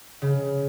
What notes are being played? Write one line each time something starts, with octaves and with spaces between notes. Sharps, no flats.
C#3